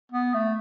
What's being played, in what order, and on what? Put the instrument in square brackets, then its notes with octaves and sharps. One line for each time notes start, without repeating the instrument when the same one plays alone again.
[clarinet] B3
A3